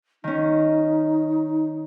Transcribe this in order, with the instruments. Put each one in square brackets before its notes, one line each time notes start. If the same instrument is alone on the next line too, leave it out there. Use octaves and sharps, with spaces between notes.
[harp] D#3 C#4 [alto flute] D#4